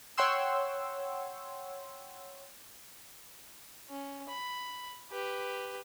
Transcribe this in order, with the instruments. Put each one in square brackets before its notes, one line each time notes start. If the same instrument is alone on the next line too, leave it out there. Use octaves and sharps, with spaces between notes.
[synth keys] C#5 F#5 G5 C6 E6
[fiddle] C#4
B5
G4 B4